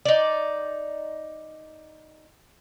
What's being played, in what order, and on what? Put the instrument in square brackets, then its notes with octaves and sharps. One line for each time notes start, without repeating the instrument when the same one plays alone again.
[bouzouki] D#4 D5